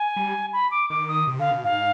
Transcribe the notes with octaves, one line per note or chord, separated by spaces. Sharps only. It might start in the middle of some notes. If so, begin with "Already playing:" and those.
Already playing: G#5
G3
B5
D6
D#3 D6
D#6
C3
D3 F5
B2
G#2 F5